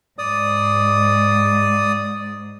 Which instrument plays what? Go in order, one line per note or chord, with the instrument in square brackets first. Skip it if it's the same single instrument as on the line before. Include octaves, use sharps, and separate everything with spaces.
[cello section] G#2 [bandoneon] D5 D#6